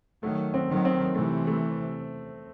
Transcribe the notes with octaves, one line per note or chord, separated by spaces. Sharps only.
D#3 F#3 A3
C4
D#3 F#3
C4
C3 E3 A3
A3